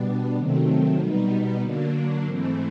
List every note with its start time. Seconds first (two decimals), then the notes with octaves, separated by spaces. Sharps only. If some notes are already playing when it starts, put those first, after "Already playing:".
Already playing: B2 G3 B3 D4
0.34 C3 D#3 F#3 A3 C4
0.97 B2 G3 B3 D#4
1.61 D3 F#3 A#3 D4
2.24 G#2 E3 A3 C4